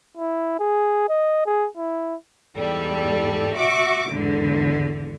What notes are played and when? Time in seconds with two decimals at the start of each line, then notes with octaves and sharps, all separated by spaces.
0.18 E4
0.59 G#4
1.09 D#5
1.46 G#4
1.77 E4
2.56 E2 G#2 G3 A4
3.57 F#4 E5 C#6 D6
4.11 G#1 E2 D3